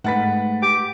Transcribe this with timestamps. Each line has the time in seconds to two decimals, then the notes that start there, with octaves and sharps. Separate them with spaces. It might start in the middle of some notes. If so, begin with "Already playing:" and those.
0.04 G#2 A3 B4 F#5 A6 B6
0.62 G4 D6